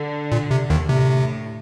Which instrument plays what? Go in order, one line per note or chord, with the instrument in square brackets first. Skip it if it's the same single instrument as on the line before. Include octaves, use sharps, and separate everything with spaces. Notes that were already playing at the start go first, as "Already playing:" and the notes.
Already playing: [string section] D3
[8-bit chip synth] A#2
C3
D#2 D#3
[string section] A2 [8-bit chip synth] C3